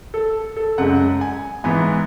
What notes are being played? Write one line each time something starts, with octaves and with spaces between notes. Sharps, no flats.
A4
A4
F#2 C#3 G#3 F#5
G#5
G#2 E3 B3 G#5